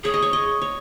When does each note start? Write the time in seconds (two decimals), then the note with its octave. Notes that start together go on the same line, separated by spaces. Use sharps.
0.04 G#4 C#5
0.14 D#5
0.22 C#5
0.33 D#5
0.61 C#5